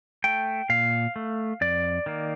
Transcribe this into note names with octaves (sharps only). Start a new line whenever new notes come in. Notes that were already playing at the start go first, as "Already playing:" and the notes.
A3 G5
A#2 F5
A3
F2 D5
D#3 A#3